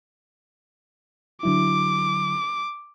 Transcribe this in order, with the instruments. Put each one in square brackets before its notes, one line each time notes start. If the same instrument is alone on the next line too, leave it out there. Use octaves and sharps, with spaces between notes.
[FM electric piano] D3 F#3 E4 [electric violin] D6